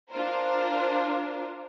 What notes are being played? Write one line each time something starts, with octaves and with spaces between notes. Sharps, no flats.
D4 F4 A#4 C5